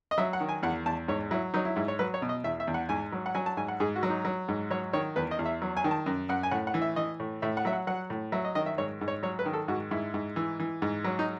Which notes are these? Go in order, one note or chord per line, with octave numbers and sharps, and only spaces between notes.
D#5
F#3 E5
F#5
D#3
G#5
E2 F#5
E2 A5
G#2 C#5
F#3 E4
F#3 D#4
E4
G#2 E4
C#5
F#3 B4
C#5
B2
D#5
E2 E5
E5
E2
F#5
G#2 G#5
F#3
F#5
F#3 G#5
A5
G#2 G#5
F#5
G#2 G#4
F#4
F#3
D#4
F#3
G#2
F#3 C#5
D#3 C#5
E2 B4
D#5
E2
E5
F#3
G#5
D#3
A5
F#2
F#2 F#5
G#5
A2 F#5
F#5
E3
E5
E3 D#5
A2
A2 E5
F#5
F#3 E5
F#5
F#3 F#5
A2
F#3 E5
D#5
D#3 D#5
E5
G#2 C#5
G#2
C#5
F#3 C#5
B4
D#3
A4
G#2 F#4
G#2 E4
G#2
E3
E3
G#2
F#3
D#4